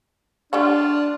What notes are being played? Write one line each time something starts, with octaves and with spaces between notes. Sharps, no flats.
G3 A3 D4 F4 F#5